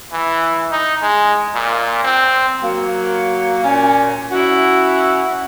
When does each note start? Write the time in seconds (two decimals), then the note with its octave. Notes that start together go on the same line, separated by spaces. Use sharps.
0.12 E3
0.71 D#4
1.02 G#3
1.54 A#2
2.04 C4
2.61 F#3 A#3
3.63 A#2 C#4
4.31 C#4 E4 F#4